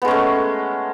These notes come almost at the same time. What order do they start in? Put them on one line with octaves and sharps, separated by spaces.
B3 G#3 C#4 A3